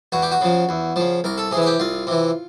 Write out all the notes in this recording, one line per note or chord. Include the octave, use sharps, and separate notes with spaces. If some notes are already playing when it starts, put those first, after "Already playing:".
E2 F#4
G4
F#4
C#3 F3
E2
C#3 F3
C2 A#4
A4
C3 G#4
E3
G#4
G4
C2 F4
C3 E3